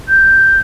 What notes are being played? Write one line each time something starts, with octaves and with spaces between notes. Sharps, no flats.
G6